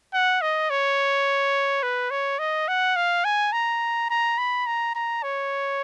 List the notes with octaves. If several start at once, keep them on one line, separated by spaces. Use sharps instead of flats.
F#5
D#5
C#5
B4
C#5
D#5
F#5
F5
G#5
A#5
A#5
B5
A#5
A#5
C#5